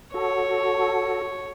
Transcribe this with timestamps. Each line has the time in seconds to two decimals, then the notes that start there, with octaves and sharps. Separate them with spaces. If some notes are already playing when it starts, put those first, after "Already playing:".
0.14 F#4 A4 C#5